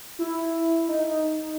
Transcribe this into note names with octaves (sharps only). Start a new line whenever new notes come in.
E4
D#4